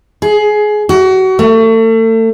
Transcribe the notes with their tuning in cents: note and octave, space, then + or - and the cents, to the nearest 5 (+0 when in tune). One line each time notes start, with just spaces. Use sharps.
G#4 +20
F#4 +30
A3 +35